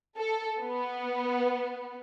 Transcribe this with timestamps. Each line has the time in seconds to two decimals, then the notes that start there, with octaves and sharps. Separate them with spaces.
0.18 A4
0.61 B3